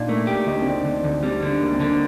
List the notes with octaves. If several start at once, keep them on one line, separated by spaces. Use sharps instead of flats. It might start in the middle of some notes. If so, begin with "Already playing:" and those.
Already playing: A#2 D4 D#4
A3 A#3
G4
D2 D#4
D4
C4
D2 D4
D2
D2
G3 C4
D3
D2 A#3
C4
D3 A#3